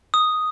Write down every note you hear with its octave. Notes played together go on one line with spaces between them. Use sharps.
D#6